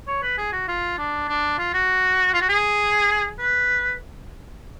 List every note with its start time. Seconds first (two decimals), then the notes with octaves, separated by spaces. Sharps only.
0.07 C#5
0.23 B4
0.38 G#4
0.52 F#4
0.68 F4
0.98 D4
1.28 D4
1.58 F4
1.74 F#4
2.34 F4
2.41 F#4
2.49 G#4
3.39 B4